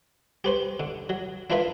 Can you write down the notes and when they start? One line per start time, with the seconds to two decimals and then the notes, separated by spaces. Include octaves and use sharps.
0.44 G4 B4 C5
0.80 D3
1.09 F#3
1.50 D4 E4 F4 A#4 B4 E5